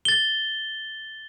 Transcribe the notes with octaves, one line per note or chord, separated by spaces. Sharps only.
A6 G7